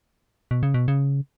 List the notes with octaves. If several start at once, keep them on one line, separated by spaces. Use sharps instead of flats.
B2
C#3
B2
C#3